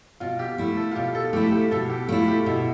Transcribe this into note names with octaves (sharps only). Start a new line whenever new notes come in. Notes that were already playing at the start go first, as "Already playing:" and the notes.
B2 F4
G4
A3 E4
A4
F4
B2 G4
A4
A3 E4 G4
G4
B2 A4
G4
A3 E4 F4
G4
B2 E4